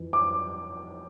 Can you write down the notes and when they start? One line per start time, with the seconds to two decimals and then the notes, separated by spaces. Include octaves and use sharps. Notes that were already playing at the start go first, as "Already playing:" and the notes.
Already playing: F2 E3
0.13 D6